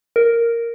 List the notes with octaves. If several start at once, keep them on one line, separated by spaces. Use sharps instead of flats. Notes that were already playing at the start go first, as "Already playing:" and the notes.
A#4